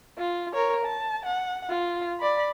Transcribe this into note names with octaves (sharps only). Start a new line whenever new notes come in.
F4
A#4 C#5
A5
F#5
F4
D5 B5